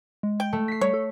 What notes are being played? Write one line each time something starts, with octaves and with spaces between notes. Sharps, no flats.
G#3
G5
A3
B6 C7
G3 C#5
A4